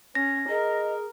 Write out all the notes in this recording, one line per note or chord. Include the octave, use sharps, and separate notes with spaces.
C#4 A#6
G#4 A#4 D#5